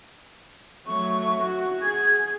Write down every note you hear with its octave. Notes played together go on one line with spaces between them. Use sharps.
F#3 A3 C#6
F#4
G#4 G#6